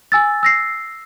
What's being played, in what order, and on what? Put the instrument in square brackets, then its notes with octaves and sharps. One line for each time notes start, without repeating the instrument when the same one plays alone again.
[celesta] G#5 E6 A6
E6 A#6 C7